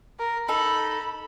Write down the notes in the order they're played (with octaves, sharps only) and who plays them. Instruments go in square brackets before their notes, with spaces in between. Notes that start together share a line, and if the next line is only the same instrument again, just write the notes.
[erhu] A#4
[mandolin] D#4 A4 [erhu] B5